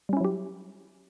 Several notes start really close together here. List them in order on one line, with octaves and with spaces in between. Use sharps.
G3 C#4 E4 F#3 G4